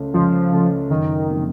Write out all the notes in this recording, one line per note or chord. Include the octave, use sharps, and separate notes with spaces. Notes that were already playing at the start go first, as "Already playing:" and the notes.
Already playing: C#2 C#3 A3
C#2 F3
C#3 A3
F#1 D#3
C3 F3 A#3